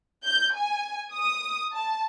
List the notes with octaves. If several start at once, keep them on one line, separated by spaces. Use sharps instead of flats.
G6
G#5
D#6
A5